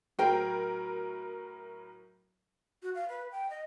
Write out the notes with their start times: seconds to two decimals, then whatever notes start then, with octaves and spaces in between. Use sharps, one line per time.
0.19 A2 F#3 A#4 C5 G5
2.82 F#4
2.95 F5
3.09 B4
3.32 G5
3.50 D#5